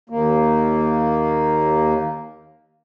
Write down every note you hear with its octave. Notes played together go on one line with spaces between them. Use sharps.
D#2 A#3